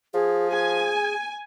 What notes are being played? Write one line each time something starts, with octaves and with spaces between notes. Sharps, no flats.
F3 G#4
G#4 G#5